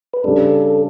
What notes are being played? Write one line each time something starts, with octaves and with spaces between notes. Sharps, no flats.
B4
C#3 G3 D4 A4